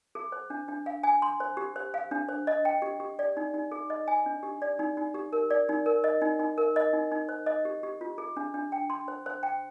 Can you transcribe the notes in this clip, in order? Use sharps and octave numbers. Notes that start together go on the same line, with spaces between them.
G#4
C5
D4
D4
F5
G#5
C6
C5
G4
C5
F5
D4
C5
D#5
G5
G4
G4
D5
D#4
D#4
G#4
D#5
G#5
D4
G4
D5
D#4
D#4
G4
A#4
D5
D#4
A#4
D#5
D#4
D#4
A#4
D#5
D#4
D#4
C5
D#5
G4
G4
F4
G#4
D4
D4
G5
C6
C5
C5
G5